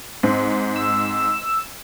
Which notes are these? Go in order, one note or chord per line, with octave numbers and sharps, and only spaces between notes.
G#2 C4
E6